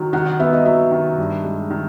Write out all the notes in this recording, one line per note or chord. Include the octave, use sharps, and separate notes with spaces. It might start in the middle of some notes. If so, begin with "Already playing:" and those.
Already playing: D#3 F#3
D#3 F#5
F#5
B3 E5
D#5
F#3 E5
D#3
G2
G#3
D#3